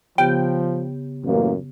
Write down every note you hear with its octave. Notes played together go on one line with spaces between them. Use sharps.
C#3 F3 B3 G4 G5
A1 F#2 A#3